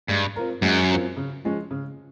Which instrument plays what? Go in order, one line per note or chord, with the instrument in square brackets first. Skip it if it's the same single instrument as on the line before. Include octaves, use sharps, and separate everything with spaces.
[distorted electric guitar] G2 [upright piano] G#3
[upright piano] C4 F4 A#4
[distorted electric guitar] F#2 [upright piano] G#3
[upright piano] C4 F4 A#4
C#3
F3 G#3 C#4
C#3